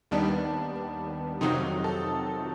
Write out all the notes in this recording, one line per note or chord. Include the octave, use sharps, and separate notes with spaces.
D#2 D#3 G3 B3 D4
F2 C3 D#3 F#3 D#4
A4